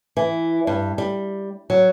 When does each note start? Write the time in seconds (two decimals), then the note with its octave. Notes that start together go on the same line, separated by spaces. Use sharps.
0.17 E3
0.67 G2
0.98 G3
1.70 F#3